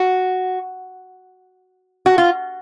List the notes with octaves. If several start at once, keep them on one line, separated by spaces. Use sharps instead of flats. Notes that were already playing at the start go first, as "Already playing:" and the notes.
Already playing: F#4
F#4
F4